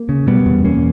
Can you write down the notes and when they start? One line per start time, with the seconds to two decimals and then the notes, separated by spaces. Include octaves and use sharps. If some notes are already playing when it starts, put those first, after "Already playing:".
Already playing: A#3
0.09 C#3
0.27 B2 G3 B3
0.46 E2
0.64 E2 A#3 C#4